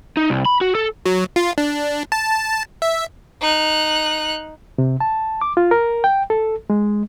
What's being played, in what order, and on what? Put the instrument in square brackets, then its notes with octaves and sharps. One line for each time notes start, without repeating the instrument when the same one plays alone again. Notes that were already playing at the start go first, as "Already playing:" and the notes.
[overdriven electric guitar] D#4
C2
B5
F#4
A4
[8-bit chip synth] F#3
F4
D4
A5
E5
[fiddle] D#4 F#6
[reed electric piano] C3
A5
D6
F4
A#4
G5
A4
G#3